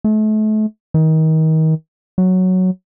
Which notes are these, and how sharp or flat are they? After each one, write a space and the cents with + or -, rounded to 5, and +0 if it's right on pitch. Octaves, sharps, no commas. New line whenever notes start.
A3 -35
D#3 +30
F#3 +0